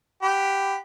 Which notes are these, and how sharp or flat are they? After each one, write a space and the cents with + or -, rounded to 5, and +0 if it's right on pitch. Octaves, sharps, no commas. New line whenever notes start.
G4 +0 F#5 +0 B5 +20